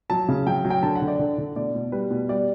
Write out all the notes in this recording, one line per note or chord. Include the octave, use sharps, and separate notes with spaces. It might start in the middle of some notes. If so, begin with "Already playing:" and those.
F#3 A5
C#3
F#3 G5
F#3
G5
D3 A5
F#5
D3
D5
D3
D3
B2 D5
B2
G3 B4
B2
G3 D5